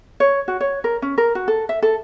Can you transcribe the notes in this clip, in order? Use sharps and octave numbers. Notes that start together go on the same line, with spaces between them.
C#5
F#4
C#5
A#4
C#4
A#4
F#4
A4
E5
A4